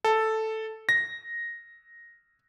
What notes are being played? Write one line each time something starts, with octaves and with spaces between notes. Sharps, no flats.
A4
A#6